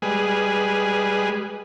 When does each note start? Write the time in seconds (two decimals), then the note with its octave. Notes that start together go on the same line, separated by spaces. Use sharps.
0.02 G3 G#3 G#4 B4